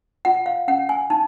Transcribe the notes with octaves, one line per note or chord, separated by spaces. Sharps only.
F4 F#5
F5
C#4 F#5
G#5
D#4 A5